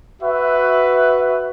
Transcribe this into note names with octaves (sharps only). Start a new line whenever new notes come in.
F#4 B4 E5